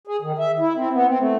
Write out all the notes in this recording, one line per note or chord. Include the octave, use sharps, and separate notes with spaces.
G#4
D#3
E5
E4
C4
B3
C4
A3